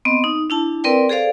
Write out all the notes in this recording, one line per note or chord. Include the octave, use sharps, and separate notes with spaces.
B3 C4 D#5
D#4
D4 E4 A5
C4 A#4 B4 D5 G5
G#4 A4 C5 D5 F5